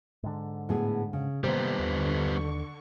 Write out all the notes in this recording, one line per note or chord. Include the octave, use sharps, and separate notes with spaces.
G#2 D3
A2 B3 G#4
C#3
C3 D#3 G3 A#3 B3 C5
D#2 D3 C#6